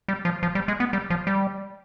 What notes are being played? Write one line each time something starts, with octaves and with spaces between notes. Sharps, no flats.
G3
F3
F3
G3
G#3
B3
G3
F3
G3